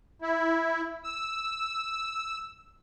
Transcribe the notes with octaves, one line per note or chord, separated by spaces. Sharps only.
E4
E6